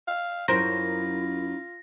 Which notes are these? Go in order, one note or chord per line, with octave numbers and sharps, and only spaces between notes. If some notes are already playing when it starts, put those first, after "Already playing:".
F5
F#2 E4 F4 A#4 C5 A#6